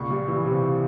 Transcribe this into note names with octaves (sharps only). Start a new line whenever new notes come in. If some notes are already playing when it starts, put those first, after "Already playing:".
Already playing: C#2 A#2 C#6
G3
E3
C3